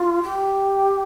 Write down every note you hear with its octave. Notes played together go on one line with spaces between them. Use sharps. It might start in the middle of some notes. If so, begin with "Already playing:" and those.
Already playing: F4
G4